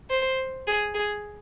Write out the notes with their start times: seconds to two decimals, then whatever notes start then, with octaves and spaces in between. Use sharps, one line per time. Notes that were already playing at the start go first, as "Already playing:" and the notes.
0.10 C5
0.67 G#4
0.95 G#4